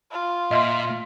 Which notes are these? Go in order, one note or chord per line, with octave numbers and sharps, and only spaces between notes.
F4
A#2 D#5 E5 C6